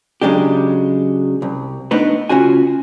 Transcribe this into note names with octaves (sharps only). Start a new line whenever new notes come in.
C#3 F#3 G#3 D4 G4
C2
A3 B3 D4 D#4 B4
C#3 C#4 F4 F#4 G#5